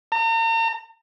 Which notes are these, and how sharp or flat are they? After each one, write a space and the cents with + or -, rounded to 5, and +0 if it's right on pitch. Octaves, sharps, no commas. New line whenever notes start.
A#5 -40